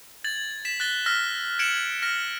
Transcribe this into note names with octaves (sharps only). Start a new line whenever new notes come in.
G#6 A6 F#7
B6 E7
F#6 A6 G7
E6 F6 A#6 B6
G#6 C#7 D7 E7 F#7
F6 A#6